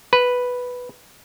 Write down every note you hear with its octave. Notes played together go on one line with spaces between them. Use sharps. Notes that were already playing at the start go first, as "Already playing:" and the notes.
B4